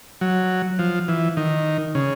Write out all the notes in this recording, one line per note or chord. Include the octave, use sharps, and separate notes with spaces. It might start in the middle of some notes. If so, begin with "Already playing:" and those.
F#3
F3
E3
D#3
C#3